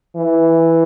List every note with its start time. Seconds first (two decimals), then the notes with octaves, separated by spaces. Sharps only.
0.16 E3